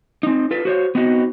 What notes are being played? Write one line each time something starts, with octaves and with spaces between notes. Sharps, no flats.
C4 D#4
F4 A4 B4
F#4 C5 C#5
B3 C4 D#4 F#4